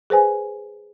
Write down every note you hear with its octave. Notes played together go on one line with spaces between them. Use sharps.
G#4 B4 C5 G#5